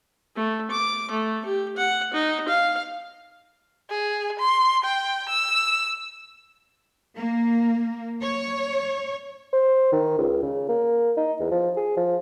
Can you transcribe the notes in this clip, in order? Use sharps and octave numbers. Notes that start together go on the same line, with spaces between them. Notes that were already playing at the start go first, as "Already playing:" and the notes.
A3
D6
A3
G4
F#5
D#4
F5
G#4
C6
G5
E6
A#3
C#5
C5
D#3
C#2
C#3
A#3
D#4
E2
F3
G#4
F3